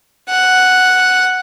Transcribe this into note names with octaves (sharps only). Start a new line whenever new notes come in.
F#5